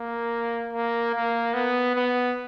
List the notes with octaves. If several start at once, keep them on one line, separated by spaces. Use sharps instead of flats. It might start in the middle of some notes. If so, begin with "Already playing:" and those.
Already playing: A#3
A#3
A#3
B3
B3